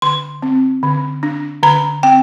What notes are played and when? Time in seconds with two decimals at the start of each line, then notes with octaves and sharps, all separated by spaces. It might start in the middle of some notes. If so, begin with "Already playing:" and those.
0.02 D3 C6
0.42 C4
0.83 D3
1.23 D4
1.63 D3 A#5
2.03 C4 G5